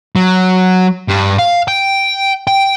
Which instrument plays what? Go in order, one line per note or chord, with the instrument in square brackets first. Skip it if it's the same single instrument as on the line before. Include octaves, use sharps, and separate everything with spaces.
[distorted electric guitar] F#3
G2
F5
G5
G5